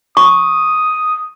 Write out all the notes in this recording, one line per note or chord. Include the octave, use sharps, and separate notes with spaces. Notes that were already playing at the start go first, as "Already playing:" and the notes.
C#6 D#6